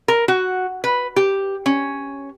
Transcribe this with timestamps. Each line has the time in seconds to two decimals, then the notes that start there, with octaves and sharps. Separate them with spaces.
0.08 A#4
0.28 F#4
0.84 B4
1.16 G4
1.66 C#4